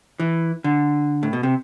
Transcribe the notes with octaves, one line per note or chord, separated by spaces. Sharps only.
E3
D3
A2
B2
C3